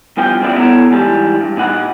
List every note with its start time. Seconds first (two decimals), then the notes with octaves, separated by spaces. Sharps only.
0.17 E2 G2 F3 G5
0.41 G2 C#3 F3 B3 E4 D5
0.58 B3 E4 A4 C#5 A5 A#5
0.91 G#2 E3 G3 A5
1.40 G2
1.57 A#2 D#4 F#5 B5